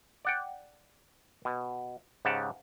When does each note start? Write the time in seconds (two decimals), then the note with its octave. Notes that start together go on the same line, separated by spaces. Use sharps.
0.25 D5 F#5 G5
1.45 B2
2.25 G#2 C#3 G4 F#5 A5